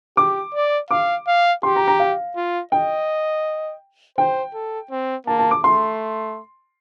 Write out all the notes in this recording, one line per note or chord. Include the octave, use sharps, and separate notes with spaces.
G4 D6
D5
F5 D6
F5
G4 C6
A#5
A#5
F5
F4
D#5 G5
C5 G5
A4
C4
A#3 A5
A5
D6
A3 C6